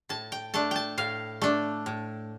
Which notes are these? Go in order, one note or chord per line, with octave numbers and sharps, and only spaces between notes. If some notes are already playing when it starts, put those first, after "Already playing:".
A2 A5
G5
A3 D4 A5
G5 A5
A2 F5
A3 D4
A2